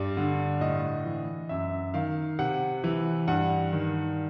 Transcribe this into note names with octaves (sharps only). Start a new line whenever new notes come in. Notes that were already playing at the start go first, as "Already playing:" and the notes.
Already playing: G2 D5
D3
A2 D#5
E3
F#2 E5
D#3 F5
C3 F#5
E3
G2 F#5
D#3